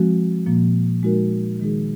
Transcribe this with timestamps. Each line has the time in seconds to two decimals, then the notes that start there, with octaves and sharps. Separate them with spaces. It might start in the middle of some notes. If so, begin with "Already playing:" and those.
Already playing: F3 G#3 C4 F#4
0.46 A#2 F3 A#3
1.03 G#3 D#4 F#4 A#4
1.60 D#3 G#3 D#4 G#4